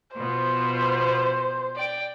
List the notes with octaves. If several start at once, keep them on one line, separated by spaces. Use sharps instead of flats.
B2 F3 B3 C5
D5 G5